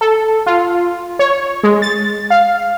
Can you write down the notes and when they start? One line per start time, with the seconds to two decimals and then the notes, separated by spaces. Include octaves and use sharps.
0.01 A4
0.46 F4
1.19 C#5
1.63 G#3
1.82 A6
2.30 F5